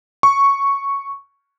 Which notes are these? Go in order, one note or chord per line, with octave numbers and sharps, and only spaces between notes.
C#6